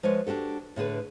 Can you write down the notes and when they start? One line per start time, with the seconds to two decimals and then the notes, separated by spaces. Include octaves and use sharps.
0.03 F3 G#3 B4 C#5
0.27 D4 F#4 G4 A4
0.76 A2 D3 G#4 B4